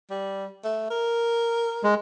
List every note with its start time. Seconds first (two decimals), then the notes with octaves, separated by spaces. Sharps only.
0.10 G3
0.64 A3
0.90 A#4
1.84 G#3